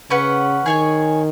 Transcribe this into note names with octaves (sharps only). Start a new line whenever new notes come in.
C#3 C#4 B4 F#5
D#3 G#4 C#5 G#5